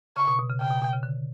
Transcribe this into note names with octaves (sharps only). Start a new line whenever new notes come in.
C#3 C#6
B2
B2
C#3
C#3 G5
B2
B2
C#3
D3